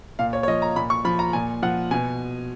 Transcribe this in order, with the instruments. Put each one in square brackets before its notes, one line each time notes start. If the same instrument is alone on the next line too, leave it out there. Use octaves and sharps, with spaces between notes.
[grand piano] A#2 F5
C#5
C#5
F3 D#5
A#5
A#2 B5
C#6
F3 B5
A#5
A#2 G#5
F3 F#5
B2 G#5